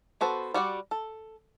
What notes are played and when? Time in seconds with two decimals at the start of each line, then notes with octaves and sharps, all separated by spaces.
0.21 B3 F#4 A4 C5
0.54 G3 F#4 D5 F#5
0.91 A4